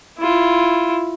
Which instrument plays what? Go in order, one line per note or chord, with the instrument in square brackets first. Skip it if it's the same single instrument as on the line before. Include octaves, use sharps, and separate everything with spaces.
[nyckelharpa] E4 F4